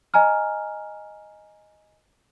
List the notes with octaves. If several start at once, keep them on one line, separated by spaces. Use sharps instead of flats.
D#5 G#5 A#5 F6